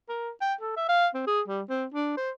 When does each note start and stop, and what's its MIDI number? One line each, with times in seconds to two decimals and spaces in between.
0.09 0.30 70
0.41 0.54 79
0.61 0.75 69
0.76 0.86 76
0.89 1.07 77
1.14 1.23 60
1.27 1.42 68
1.48 1.62 55
1.69 1.85 60
1.94 2.14 62
2.17 2.31 72